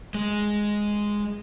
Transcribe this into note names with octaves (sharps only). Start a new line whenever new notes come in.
G#3